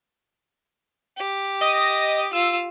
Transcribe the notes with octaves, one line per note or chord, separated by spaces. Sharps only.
G4
D#5 D#6
F4 E6